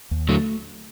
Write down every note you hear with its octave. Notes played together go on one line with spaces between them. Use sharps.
D#2
D3 F#3 A3